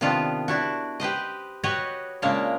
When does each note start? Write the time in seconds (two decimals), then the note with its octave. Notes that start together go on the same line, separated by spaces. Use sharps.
0.01 C3 D#3 B3 D4 F4
0.48 D4 E4 F#4
1.00 G4 B4 C5 D#5
1.64 F#4 G4 B4 C#5 D#5
2.22 A#2 C#3 G#3 A#3 D4 A#4